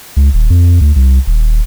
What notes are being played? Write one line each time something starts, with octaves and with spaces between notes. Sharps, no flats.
C#2
D#1
F2
D2
C2
D#1